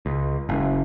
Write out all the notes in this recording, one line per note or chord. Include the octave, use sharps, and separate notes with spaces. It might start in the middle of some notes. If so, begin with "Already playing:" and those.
C#2
F#1